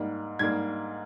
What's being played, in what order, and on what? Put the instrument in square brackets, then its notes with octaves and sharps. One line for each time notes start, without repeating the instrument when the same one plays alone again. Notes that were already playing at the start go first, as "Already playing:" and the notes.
Already playing: [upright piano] G#2 G3 A#3
G#2 G3 A#3 G#6